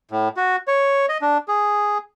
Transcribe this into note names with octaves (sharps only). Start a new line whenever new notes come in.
A2
F#4
C#5
D#5
D4
G#4